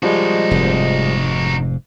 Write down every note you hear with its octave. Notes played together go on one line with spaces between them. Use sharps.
F3 G3 G#3 D#4 F#4
F1 G#2